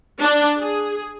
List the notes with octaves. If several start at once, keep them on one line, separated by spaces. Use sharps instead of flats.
D4
G#4